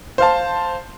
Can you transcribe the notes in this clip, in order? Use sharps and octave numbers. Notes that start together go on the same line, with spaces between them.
C5 F5 A5